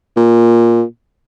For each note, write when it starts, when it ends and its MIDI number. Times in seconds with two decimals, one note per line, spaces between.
0.17 0.83 46